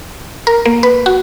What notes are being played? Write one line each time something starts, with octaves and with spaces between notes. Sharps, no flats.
A#4
A#3
B4
F#4